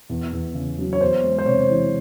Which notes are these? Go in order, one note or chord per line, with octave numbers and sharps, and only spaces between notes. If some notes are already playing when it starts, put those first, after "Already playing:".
E2
E2
C#3
F#3
C#5
E2 C5
G#3
C5
C3 C#5
E3